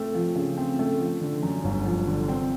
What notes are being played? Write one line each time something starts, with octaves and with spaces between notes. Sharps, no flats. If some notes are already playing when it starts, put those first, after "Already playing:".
Already playing: A3 C4
F3
C#3
C4
A3
F3
D3
F#2
G1
F3
D3
C4